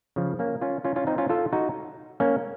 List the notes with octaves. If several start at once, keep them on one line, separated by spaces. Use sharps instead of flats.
C#3 F3
A#3 C#4
C#4 F4
C#4 F4
C#4 F4
C4 D#4
C#4 F4
F4 A4
D#4 F#4
A#3 C#4